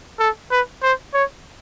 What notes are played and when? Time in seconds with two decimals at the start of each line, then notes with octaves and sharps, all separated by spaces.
0.20 A4
0.52 B4
0.83 C5
1.14 C#5